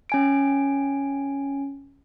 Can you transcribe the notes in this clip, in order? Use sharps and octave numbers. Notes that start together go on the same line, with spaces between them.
C#4 G#5 D7